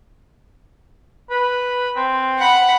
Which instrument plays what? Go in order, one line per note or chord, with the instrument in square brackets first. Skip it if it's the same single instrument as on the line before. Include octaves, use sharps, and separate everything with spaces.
[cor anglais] B4
C4
[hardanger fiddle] F#5 B5